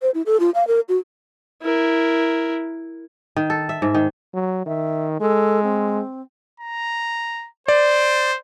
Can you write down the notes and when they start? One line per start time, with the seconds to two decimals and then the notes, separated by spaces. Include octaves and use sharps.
0.02 C5
0.14 E4
0.26 A4
0.40 F4
0.55 F5
0.67 A#4
0.89 F#4
1.63 E4 A#4
3.36 D#3
3.50 A4
3.69 E5
3.82 G#2
3.94 D#3
4.34 F#3
4.66 D#3 E5
5.20 G#3 A4
5.63 C4
6.60 A#5
7.68 C5 D5